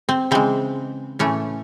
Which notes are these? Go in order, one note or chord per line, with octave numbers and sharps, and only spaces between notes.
C4
C#3 E3 G#3 C4
A2 E3 A3 C#4